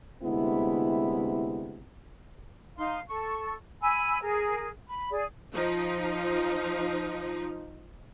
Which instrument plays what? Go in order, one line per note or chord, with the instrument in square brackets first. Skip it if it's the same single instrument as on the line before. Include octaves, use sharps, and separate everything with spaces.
[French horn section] D2 C3 G#3 B3 E4
[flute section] D#4 F5 C6
A4 C#6
G#5 B5 E6
G#4 A#4
B5
G#4 D5
[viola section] F3 D#4